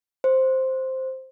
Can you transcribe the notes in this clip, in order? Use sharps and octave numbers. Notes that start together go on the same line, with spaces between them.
C5